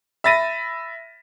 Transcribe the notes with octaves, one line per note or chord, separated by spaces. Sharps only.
E5 B5 A6 A#6 D#7